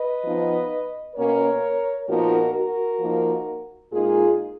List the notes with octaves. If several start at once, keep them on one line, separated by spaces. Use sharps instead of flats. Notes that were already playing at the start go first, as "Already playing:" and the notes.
Already playing: B4 D#5
F3 B3 D#4
B2 A#3 C#4 A#4 C#5
A#2 F3 B3 D#4 F#4 A#4
F#4 A#4
F3 A#3 D#4
A#2 G#3 D#4 F4 G#4